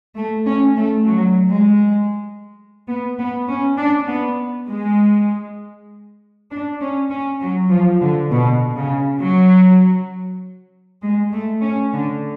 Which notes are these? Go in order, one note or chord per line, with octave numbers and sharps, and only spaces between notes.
A3
C#4
A3
F#3
G#3
B3
B3
C#4
D4
B3
G#3
D4
C#4
C#4
F#3
F3
D3
B2
C#3
F#3
G#3
A3
C#4
D3